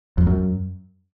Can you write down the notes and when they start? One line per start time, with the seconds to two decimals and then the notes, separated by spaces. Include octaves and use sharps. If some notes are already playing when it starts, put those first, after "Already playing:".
0.18 F2
0.27 F#2